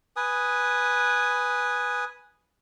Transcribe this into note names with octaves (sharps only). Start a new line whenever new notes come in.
B4 G#5 D#6